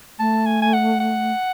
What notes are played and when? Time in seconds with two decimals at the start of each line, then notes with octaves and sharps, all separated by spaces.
0.19 A3 A5
0.46 G#5
0.62 G#5
0.74 F#5
1.00 F#5